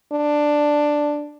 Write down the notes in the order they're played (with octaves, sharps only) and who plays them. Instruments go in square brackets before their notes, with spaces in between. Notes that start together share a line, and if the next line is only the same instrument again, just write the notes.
[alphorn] D4